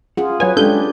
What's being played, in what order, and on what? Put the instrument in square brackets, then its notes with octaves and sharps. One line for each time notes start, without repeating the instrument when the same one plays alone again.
[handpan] C#4 F4 G#4 [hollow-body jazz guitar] F#5
[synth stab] F#3 C#5 G#5 [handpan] B4
[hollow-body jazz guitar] G#3 C#4 [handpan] D4 G4 [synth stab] A4 G6